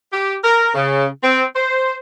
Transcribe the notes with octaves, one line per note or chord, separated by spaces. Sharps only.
G4
A#4
C#3
C4
C5